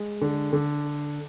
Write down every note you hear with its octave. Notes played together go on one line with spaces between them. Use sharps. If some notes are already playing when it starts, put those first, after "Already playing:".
Already playing: G#3
D3
D3